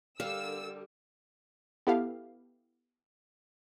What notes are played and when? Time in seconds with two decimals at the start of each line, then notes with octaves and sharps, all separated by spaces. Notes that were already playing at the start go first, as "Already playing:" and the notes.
0.20 D3 G3 G4 A#4 F5 E6
1.87 B3 E4 G4 A4 F5